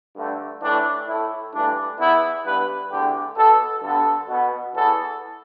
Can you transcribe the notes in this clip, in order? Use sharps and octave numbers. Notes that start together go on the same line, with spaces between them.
G2 D3 A3
A2 E3 A3 D4
A2 A3 E4
G2 E3 A3 D4
E2 E3 B3 E4
G2 G3 B3 B4
E2 D3 A3 G4
B2 B3 A4
G2 D3 B3 A4
B2 B3
E2 E3 B3 A4